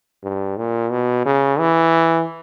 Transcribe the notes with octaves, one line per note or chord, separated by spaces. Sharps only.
G2
A#2
B2
C#3
E3